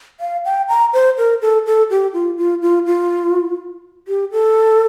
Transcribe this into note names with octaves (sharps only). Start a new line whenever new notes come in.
F5
G5
A#5
C5
A#4
A4
A4
G4
F4
F4
F4
F4
G4
A4